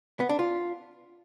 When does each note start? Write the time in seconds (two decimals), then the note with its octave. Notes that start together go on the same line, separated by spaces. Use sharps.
0.20 B3
0.29 D4
0.39 F4